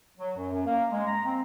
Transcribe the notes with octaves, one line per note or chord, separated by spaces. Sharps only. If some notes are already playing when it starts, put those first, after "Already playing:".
F#3
F#2
F#2
A#3
G#3
A#5
C4